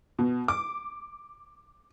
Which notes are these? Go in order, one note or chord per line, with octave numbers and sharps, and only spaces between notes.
B2
D6